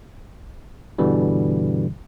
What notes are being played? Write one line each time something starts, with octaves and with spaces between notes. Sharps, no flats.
G2 B2 D3 E3 G3